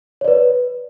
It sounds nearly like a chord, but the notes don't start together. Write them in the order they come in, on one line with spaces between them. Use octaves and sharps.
C#5 D5 B4